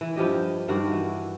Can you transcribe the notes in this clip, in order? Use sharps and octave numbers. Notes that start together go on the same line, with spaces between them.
E3
G2 F3 G4 D#5
G2 D#3 F#4 D5
E3